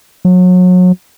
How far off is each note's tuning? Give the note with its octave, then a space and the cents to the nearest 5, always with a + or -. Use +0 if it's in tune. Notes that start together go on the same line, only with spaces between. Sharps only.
F#3 -30